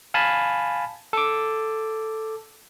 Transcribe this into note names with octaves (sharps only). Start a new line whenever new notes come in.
F5 G#5 A5 B5
A4 D6